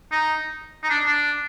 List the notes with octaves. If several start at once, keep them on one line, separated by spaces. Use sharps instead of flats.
D#4
D#4
D4
D4